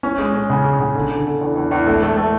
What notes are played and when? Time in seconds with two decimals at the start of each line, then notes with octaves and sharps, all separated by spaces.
0.03 C#4
0.18 G#3
0.34 C#4
0.50 C#3
0.64 G#4
0.80 C#3
0.95 D3
1.10 D3
1.26 D3
1.41 E2
1.56 E2
1.71 E2
1.87 A3
2.02 A3
2.17 A3